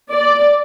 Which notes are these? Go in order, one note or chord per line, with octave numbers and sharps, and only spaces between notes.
D5